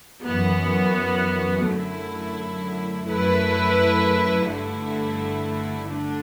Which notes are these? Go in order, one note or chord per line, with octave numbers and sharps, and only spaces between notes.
F#2 E3 B3 F#4
F#2 D3 F#3 A3 E4
F#2 F#3 A3 E4 B4
G1 G2 D3 A3 E4
D3 A3 D4